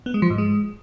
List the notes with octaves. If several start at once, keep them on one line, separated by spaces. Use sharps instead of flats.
B3
G#3
F3
G#2
G#3